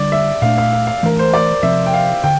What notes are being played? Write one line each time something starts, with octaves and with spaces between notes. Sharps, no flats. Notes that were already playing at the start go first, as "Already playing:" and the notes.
Already playing: D3 G3 D4 D5
E5
A#2 A3 D4 F5
F5
F5
F5
E3 A3 D4 A#4
C5
D5
C3 F3 C4 E5
G5
F5
D3 G5